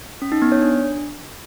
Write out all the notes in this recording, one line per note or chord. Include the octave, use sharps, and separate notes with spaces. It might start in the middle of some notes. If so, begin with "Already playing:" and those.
C#4
D#4
B3
C#5
D4